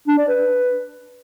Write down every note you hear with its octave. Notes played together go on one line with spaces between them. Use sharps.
D4
D5
B4